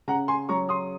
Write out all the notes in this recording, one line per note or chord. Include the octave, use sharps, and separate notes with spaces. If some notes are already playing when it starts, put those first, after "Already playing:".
C#3 F#5 A#5
G#5 C6
F#3 A#5 C#6
C6 D#6